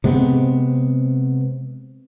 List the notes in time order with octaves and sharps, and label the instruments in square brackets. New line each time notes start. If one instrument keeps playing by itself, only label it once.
[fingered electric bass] C3 G#3 B3 C4